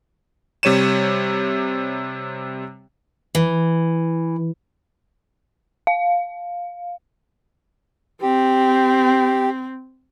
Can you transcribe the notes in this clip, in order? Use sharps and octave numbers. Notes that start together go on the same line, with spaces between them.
C3 G3 C#5 D#7 E7
E3
F5
C4 G4